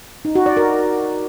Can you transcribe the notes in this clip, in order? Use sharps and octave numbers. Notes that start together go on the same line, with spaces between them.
D#4
F#4
D5
A#4